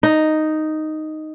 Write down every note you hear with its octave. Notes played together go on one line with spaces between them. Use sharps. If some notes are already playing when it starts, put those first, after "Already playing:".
D#4